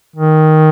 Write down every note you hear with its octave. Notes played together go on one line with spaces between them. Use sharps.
D#3